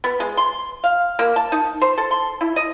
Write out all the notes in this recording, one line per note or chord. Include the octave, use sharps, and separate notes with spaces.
B3
G#3
C6
F5
A#3
A5
D#4
C5
A4
C6
E4
D#5